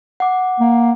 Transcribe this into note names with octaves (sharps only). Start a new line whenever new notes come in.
F#5 D6
A#3